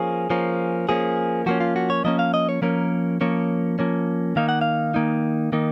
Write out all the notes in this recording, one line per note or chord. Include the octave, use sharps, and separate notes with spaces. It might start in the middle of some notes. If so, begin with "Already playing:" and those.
Already playing: F3 A#3 C#4 G#4
F3 A#3 C#4
F3 A#3 C#4 G#4
F3 A#3 C#4 F#4
F4
F#4
C#5
F3 A#3 C#4 D#5
F5
D#5
C#5
F3 A#3 C#4 A#4
F3 A#3 C#4 C#5
F3 A#3 C#4
D#3 A#3 D#4 F5
F#5
F5
D#3 A#3 D#4
D#3 A#3 D#4